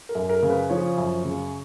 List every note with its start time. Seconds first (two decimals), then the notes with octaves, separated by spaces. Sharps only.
0.09 A#4
0.15 F#2
0.29 A#4
0.42 C#3
0.50 B4
0.70 F3 C#5
0.98 F#2
1.25 C#3